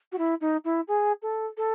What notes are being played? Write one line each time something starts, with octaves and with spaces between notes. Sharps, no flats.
F#4
E4
D#4
E4
G#4
A4
A4